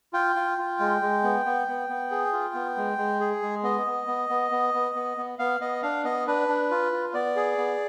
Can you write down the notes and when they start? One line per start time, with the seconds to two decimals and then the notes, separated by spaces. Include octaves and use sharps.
0.13 F4 G5
0.36 F4
0.58 F4
0.80 G#3
1.02 G#3
1.23 B3
1.46 B3
1.68 B3
1.89 B3
2.11 G#4
2.33 F4
2.54 B3
2.77 G#3
2.98 G#3
3.20 G#4
3.42 G#3
3.63 B3 D#5
3.86 B3
4.07 B3
4.30 B3
4.51 B3
4.74 B3
4.95 B3
5.18 B3
5.39 B3 F5
5.60 B3 D#5
5.83 D4 F5
6.04 B3 D#5
6.27 D4 B4
6.48 D4
6.71 F4
6.92 F4
7.14 B3 D5
7.36 G#4
7.58 B3